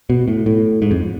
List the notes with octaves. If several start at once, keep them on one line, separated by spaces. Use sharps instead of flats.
B2
A2
A2
G#2
F2